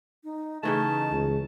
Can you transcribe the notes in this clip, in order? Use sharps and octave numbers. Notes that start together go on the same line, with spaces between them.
D#4
C#3 E3 A3 D#4 A5
C#2